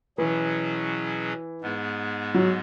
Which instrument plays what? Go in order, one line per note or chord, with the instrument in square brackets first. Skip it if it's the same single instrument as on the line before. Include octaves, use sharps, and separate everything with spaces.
[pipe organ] B2 F#3 C#4 G#4 [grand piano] E3
[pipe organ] G#2 G#3 B3 G#4
[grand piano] F#3